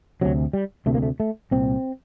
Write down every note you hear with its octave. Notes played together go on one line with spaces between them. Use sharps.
D2 C3 F#3
G3
D2 C3 A3
A#3
A3
A3
C2 A#2 C4